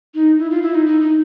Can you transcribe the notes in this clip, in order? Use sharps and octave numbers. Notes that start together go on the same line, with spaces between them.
D#4
E4
F4
E4
D#4
D#4
D#4